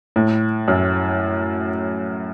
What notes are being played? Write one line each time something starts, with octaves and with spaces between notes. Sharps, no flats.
A2
F#2